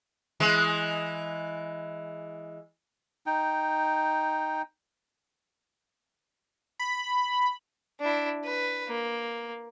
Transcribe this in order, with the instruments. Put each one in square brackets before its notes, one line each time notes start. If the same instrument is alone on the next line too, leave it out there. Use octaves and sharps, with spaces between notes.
[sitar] E3 G#3
[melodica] D#4 G5
[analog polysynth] B5
[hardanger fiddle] D4 E4
B4
A#3